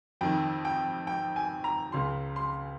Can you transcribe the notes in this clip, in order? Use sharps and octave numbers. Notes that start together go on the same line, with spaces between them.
F2 D#3 G5
G5
G5
G#5
A#5
C#2 C#3 C6
C6